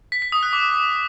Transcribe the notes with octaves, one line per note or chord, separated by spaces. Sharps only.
B6
B6
D#6
F#6
D6